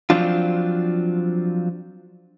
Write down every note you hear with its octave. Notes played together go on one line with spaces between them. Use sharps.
F3 F#3 C4 D4 F4